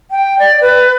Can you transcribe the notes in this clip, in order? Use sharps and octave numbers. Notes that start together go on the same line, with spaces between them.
G5
D5
B4